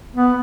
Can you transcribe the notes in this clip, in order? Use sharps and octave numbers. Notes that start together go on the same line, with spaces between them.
B3